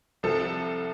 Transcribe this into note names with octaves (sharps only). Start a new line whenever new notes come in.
C2 C3 F3 A4